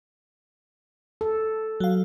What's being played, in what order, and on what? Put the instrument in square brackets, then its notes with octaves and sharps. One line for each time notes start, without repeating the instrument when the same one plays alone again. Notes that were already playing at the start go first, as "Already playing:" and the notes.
[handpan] A4
[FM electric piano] F#3 F5